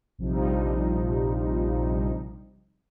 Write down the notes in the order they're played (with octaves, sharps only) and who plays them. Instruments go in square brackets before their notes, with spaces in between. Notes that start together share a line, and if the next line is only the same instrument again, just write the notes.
[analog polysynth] A#1 C3 F3 G3 D#4